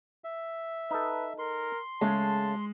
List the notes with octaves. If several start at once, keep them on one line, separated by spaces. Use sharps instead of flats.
E5
D#4 A4 B4
A#4 C6
C#3 G#3 A3 A5